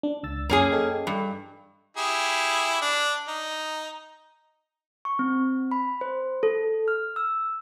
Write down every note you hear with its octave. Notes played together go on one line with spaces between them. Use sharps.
D4
C#2 E6 A6
F#2 A#3 C#4 G#4
A4 D#5 G5
G2
E4 G4 G#4
D4
D#4
C#6
C4
B5
C5
A4
F6
E6